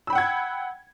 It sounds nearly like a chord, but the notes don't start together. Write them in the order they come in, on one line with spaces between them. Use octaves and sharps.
E6 B5 G5 F#5 G#6